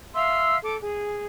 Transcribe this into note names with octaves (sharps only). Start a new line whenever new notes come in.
E5 F5 C6 E6
A4 D6
G#4